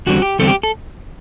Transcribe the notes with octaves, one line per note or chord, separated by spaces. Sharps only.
E2 D3 G3 C4 F#4
G4
E2 D3 G3 C4 A4
G4
A4